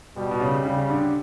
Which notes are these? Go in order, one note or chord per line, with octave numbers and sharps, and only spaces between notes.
B2 G3
B2
C#3
C#3 G3
D3